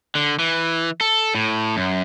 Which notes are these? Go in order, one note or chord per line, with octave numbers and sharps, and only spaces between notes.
D3
E3
A4
A2
F#2